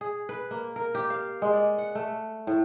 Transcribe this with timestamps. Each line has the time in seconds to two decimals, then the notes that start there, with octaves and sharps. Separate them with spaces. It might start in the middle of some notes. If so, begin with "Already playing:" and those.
0.01 G#4
0.29 B4
0.51 A#3
0.76 A#4
0.95 G4
1.10 F5
1.42 G#3
1.53 D5
1.78 F#5
1.95 A3
2.47 A2